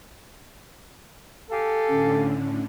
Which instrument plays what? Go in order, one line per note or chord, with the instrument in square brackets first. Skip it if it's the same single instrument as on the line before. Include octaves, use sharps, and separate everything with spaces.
[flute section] G4 F5 G#5 [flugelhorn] A4
[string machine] A2 D3 [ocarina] C#4